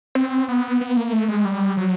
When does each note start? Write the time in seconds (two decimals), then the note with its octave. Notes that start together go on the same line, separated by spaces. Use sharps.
0.15 C4
0.48 B3
0.81 B3
0.97 A#3
1.13 A3
1.28 G#3
1.45 G3
1.77 F#3